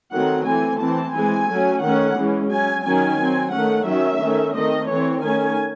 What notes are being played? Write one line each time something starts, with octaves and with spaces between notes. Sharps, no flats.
D#3 F#3 A3 C4 F#5
E3 A3 C4 G#5
E3 C4 A5
E3 G#3 C4 G#5
F#3 A3 C#4
D#3 A3 C#4 F#5
E3 G#3 C#4
F#3 C#4 G#5
D#3 F#3 C#4 G#5
F#3 C4
D#3 A3 C#4 F#5
D#3 F#3 C#4 E5
D#3 A3 C#4
D#3 A3 C4 D#5
E3 C4 C#5
D#3 A3 C#4 G#5